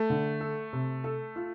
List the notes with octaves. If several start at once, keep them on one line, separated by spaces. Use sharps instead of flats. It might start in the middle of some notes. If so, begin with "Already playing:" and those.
Already playing: A3
D3
A4
C3
A4
F4